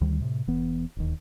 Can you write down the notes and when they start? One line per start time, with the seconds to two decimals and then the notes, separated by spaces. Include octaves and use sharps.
0.01 D2 D#3 G3
0.20 A2 C3
0.47 E1 E3 B3
0.97 D1 D#2